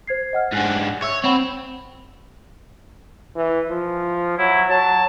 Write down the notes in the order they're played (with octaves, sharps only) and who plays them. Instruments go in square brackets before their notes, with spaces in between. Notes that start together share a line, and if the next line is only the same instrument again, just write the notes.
[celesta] C5 G#6 C7
D#5 F#5 F6
[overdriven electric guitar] G#2 D4 [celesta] F#5 G#5 F#6
[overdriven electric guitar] C#5 [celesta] E5 C#6 E6
[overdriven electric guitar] C4 [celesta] C#5 F#5 B5
[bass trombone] E3
F3
[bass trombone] F#3 [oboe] E4
[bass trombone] F#3 [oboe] A5